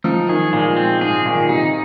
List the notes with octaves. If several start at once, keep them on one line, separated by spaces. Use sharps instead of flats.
F3 D#4
D#3 G#4
A#2 G#3
C4
G#2 G#4
A#2 D#3
C3 D#4